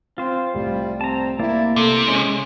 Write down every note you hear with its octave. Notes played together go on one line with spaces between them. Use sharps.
C4 F4 C5
C2 A2 G3
C4 A5 A#5
A#3 E4 D5
C3 A4
G#3 C#4